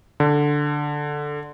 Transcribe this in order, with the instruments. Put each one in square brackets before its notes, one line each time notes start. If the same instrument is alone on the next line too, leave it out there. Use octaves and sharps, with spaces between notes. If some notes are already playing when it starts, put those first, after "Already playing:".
[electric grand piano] D3